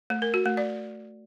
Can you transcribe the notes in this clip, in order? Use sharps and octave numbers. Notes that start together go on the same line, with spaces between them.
A3
A#4
F#4
A3
D5